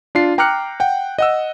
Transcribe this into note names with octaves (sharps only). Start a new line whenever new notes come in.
D4 F4 C7
G5 A#5 D6 F6 F#6 C#7
F#5 G5
D#5 F#5 E6